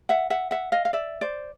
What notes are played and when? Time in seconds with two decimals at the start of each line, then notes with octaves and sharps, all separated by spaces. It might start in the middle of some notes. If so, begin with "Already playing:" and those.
0.09 E5 F#5
0.30 E5 F#5
0.51 E5 F#5
0.72 D#5 F5
0.85 F5
0.93 D5 E5
1.21 C5 D5